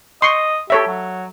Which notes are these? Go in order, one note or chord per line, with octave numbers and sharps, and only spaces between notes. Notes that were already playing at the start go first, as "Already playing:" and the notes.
D#5 C6 C#6
G4 A4 C#5 E5
F#3